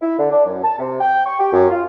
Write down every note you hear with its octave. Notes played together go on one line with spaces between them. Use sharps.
E4
D3
D4
F#2
A5
C3
G5
C#6
G4
F#2
F4